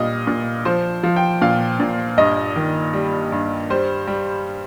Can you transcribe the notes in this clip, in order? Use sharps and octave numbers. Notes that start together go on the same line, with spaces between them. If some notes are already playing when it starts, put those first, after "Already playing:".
Already playing: A#2 G3 D#5 F5
A#2
F3 C5
F3
G5
A#2 F5
A#2
G2 D#5
D#3
G3
G2
G3 C5
G3